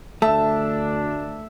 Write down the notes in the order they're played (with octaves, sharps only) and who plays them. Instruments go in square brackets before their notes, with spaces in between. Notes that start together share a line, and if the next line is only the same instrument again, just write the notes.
[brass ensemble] D2 D4 [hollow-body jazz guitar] A3 [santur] E5 [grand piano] A5